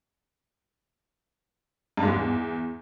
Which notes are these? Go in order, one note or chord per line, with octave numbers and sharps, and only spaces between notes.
G2
G#2
E2